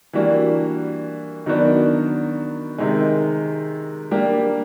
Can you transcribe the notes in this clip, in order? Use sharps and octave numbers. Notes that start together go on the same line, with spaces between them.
E3 G3 A#3 D4 F#4
D#3 F#3 B3 D4 F#4
C3 D#3 G#3
G3 A#3 D4 G4